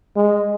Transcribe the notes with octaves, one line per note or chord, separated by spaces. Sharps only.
G#3